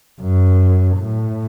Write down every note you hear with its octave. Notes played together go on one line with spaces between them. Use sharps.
F#2
A2